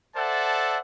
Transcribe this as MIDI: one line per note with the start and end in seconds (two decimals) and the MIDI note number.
0.16 0.78 69
0.16 0.78 72
0.16 0.78 74
0.16 0.78 76
0.16 0.78 78
0.16 0.78 81